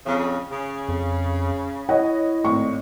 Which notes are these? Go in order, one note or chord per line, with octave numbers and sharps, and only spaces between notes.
F2 C#3
C#3
F2
E4 C#5 D#5 F#5
G#1 A2 C#6